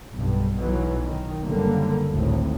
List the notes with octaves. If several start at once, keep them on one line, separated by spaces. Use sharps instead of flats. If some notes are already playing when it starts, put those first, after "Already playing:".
B1 G2
B1 B2 E3 F#3
D#3
F#1 D3 G3 A#3
G#1 D2 A2